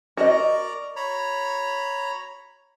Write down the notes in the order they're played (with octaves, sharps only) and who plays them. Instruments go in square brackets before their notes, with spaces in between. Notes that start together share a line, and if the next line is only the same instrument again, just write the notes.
[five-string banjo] F#4 D#5 [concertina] A#4 D5 A#5
[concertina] C#5 A#5 B5